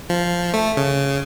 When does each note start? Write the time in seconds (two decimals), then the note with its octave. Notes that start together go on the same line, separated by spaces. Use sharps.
0.10 F3
0.54 A3
0.77 C#3